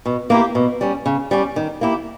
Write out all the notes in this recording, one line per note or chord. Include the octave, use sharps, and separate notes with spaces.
B2
A#3 E4 G4
B2
G3 C#4
C#3
G3 C#4 G4
D#3
A#3 E4 G4